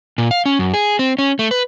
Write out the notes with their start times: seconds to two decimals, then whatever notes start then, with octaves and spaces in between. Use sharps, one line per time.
0.18 A#2
0.31 F5
0.46 C#4
0.59 F#2
0.74 G#4
0.99 C4
1.19 C#4
1.39 A3
1.51 B4